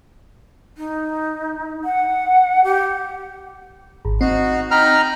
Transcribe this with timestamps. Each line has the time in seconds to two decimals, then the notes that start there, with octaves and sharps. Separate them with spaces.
0.77 D#4
1.84 F#5
2.64 G4
4.05 G#1
4.21 C4 D#4 F#4
4.71 D#4 G5 A#5 B5 F6